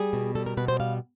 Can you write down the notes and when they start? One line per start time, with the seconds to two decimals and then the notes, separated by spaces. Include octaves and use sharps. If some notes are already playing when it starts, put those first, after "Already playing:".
Already playing: G3 G#4
0.13 B2
0.35 G3 A4
0.46 A#4
0.57 B2 B4
0.68 C5
0.80 G3 F5